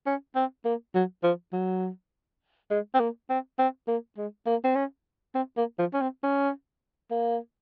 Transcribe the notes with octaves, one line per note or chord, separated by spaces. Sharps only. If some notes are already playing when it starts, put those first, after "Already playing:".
C#4
C4
A#3
F#3
F3
F#3
G#3
C4
A#3
C4
C4
A#3
G#3
A#3
C4
C#4
C4
A#3
F3
C#4
C4
C#4
A#3